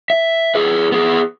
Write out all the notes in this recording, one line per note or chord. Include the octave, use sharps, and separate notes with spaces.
E5
G#4 B4
B3 G#4